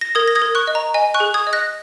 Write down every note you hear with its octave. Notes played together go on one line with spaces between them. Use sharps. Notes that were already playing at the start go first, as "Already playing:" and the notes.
A#6
A#4 D#6 G#6
A#6
D#6 G#6
A#4
C#6 F#6
D#5
A#5
D#5 G#5
C#6 F#6
G#4
D#6 G#6
D#5
F#6 A#6